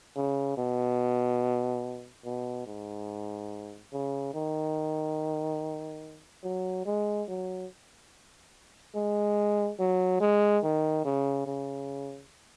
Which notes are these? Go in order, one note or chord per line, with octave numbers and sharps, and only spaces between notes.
C#3
B2
B2
G#2
C#3
D#3
F#3
G#3
F#3
G#3
F#3
G#3
D#3
C#3
C#3